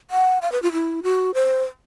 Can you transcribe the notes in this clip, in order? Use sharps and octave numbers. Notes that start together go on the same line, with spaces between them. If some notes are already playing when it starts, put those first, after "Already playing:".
F#5
F5
B4
F4
E4
F#4
C5